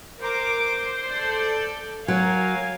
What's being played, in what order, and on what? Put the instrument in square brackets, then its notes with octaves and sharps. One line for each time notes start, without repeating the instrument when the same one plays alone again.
[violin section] A#4 D6 [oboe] C5
[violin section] A4 D5 G6
[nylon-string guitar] F#3 [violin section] A#4 F5 [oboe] G#5